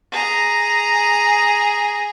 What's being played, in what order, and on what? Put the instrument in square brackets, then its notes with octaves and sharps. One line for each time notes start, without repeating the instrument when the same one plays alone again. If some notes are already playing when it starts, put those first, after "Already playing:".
[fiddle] G#4 A#5